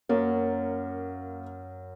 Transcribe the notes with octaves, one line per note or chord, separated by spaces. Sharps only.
F#2 A#3